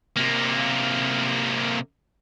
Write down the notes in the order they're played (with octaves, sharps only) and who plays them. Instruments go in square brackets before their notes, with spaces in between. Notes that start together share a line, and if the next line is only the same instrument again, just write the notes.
[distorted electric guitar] C3 A#3